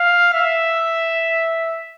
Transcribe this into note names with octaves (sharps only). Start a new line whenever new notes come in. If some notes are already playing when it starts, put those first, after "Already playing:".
Already playing: F5
E5